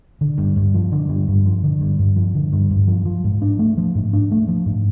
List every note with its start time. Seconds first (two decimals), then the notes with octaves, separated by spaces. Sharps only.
0.21 D3
0.38 G2
0.56 G2
0.74 F3
0.92 D3
1.09 G2
1.28 G2
1.45 F3
1.63 D3
1.81 G2
1.99 G2
2.16 F3
2.35 D3
2.53 G2
2.70 G2
2.88 F3
3.06 F3
3.24 G#2
3.42 D4
3.59 A3
3.77 F3
3.95 G#2
4.13 D4
4.31 A3
4.48 F3
4.66 G#2